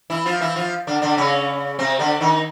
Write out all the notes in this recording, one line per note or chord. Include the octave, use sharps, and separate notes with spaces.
E3 E4
F3 F4
E3 E4
F3 F4
D3 D4
D3 D4
C#3 C#4
C3 C4
D3 D4
D#3 D#4